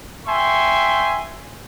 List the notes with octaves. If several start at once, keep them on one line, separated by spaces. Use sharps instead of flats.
E5 G5 G#5 C6 C#6